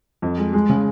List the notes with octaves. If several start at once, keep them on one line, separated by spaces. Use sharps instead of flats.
F2
G#3
G#3
C#3